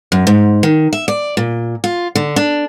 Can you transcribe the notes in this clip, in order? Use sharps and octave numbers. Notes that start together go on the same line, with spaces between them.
F#2
G#2
D#3
E5
D5
A#2
F4
D3
D4